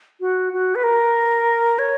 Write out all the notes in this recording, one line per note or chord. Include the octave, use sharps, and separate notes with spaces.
F#4
F#4
B4
A#4
C#5